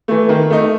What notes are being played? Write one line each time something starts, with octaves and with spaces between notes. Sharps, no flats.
E3 A3
D#3
A3 D#4